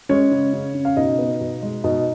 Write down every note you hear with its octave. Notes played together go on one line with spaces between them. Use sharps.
G#3 C#4 C#5
C#3
C#3
C#3
F5
B2 D#4 D#5
B3
B2
G#3
B2 D#4 D#5